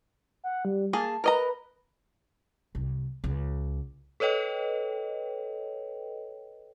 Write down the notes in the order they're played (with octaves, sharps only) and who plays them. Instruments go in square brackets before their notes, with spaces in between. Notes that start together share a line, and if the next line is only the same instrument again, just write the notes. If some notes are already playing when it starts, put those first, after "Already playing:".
[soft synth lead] F#5
G3
[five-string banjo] A#3 G#4 [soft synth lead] A5
[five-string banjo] A#4 D#5 A#5 [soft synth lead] B4
[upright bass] C2
C#2
[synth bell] A4 B4 C#5 D#5 G5